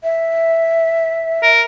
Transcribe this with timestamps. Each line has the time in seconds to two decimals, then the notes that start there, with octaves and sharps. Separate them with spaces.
0.04 E5
1.43 A#4